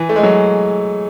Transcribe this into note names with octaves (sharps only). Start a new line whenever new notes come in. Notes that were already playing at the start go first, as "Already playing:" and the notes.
Already playing: E3
A3
G#3
F#3